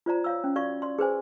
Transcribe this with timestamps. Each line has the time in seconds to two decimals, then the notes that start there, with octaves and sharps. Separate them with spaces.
0.06 F4 C5 D5 A#5
0.24 C#5 F5 E6
0.44 C#4
0.56 F#4 D5 F5 C#6
0.82 D5 C6
0.99 G#4 B4 C5 G#5